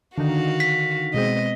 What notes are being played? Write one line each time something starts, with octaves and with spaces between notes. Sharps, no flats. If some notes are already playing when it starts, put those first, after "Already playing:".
D3 D#3 F#4 F5
B6
B2 G#3 C4 D#5